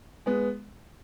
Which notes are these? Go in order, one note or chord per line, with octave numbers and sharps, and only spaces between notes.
G#3 B3